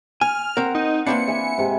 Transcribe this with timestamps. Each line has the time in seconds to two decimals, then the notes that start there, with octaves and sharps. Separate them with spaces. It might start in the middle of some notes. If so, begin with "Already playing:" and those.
0.21 G#5 F6
0.57 C4 A#4 F#5
0.75 D#4
1.06 A#3 C4 D4 E4 B4 C#7
1.28 E5 G#5
1.58 G#2 C3